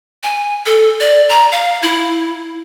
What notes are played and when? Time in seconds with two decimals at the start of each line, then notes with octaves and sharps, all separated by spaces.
0.23 G#5
0.66 A4
1.00 D5
1.29 A#5
1.52 F5
1.83 E4